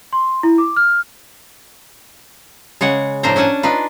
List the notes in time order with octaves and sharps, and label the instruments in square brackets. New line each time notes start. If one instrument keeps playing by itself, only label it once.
[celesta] C6
E4
D6
F6
[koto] C#3 G#3 C#5 F#5
A2 F3 A#3 D4 C5 A#5
C#4 D4 F#5 G#5 A5
D4 D#4 F4 B4